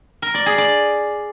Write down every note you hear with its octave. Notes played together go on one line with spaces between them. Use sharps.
A#4
D5
G#4
D5